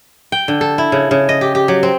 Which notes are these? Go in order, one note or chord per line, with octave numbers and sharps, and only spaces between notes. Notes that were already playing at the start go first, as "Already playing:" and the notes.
G5
D3
A4
E4
C#3
C#3
D#5
G4
G4
F#3
C4